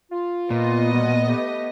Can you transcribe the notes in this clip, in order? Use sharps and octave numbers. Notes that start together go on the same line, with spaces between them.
F4
A#2 B3 D#5
B2 G3
A3 G4